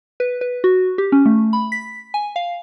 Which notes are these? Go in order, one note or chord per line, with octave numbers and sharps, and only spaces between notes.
B4
B4
F#4
G4
C#4
A3
B5
B6
G#5
F5